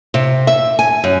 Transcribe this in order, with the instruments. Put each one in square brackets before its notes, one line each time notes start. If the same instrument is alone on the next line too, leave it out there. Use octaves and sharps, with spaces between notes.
[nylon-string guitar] C3
E5
G#5
F#2